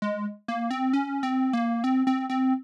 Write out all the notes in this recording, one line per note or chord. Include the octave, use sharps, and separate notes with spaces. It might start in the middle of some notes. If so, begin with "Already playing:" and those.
G#3
A#3
C4
C#4
C4
A#3
C4
C4
C4